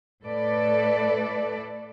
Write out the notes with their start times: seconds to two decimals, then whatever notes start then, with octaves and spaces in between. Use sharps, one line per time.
0.24 A2 A4 B4 D5